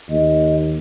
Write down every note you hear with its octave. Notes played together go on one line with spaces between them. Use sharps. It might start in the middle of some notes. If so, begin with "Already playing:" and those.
D#2 D#5